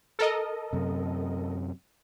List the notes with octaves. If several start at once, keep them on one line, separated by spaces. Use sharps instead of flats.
A4 A#4 D#5
F#2 C3